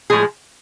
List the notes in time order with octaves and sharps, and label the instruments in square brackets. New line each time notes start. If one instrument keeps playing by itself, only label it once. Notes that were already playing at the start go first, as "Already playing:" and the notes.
[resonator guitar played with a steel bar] A2 F3 G#3 G#4